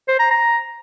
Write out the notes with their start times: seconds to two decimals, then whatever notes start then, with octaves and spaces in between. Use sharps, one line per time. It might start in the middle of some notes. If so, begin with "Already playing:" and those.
0.08 C5
0.19 A#5
0.31 A#5